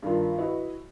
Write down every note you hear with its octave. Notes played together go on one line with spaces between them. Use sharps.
G2 D#3 D4 F4
E4 F#4 B4 D#5